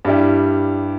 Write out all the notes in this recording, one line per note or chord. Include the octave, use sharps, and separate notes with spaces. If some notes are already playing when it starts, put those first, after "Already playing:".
G2 G3 E4 G4